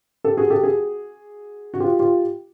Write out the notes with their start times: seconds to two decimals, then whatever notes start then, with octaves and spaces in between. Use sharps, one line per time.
0.24 G4 A4
0.37 F#4 G#4
0.50 G4 A4
0.63 F#4 G#4
1.74 F#4
1.80 F4 G4
2.00 F4 G4